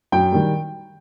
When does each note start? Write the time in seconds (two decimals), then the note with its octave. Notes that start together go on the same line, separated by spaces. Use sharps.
0.12 F#2 G5
0.32 D#3 G3